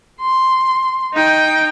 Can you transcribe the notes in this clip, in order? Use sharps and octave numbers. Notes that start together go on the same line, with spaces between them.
C6
D#4 G5